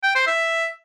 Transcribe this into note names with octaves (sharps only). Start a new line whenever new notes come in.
G5
C5
E5